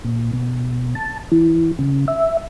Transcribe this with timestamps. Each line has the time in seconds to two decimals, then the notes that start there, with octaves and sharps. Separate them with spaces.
0.04 A#2
0.33 B2
0.95 A5
1.32 E3
1.79 C#3
2.08 E5